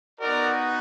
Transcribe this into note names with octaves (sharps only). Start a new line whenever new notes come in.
B3 D#4 F#4 A#4 D5